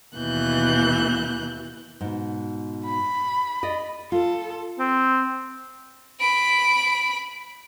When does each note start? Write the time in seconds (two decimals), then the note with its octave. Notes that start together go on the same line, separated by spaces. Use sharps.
0.15 D#2 B2 E3 F#6 G6
2.01 G#2 B2
2.85 B5
3.63 D5 D#5
4.12 F4 A4
4.79 C4
6.21 B5 D7